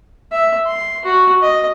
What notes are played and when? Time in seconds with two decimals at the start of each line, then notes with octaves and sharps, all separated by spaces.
0.32 E5
0.66 C6
1.04 F#4
1.42 D#5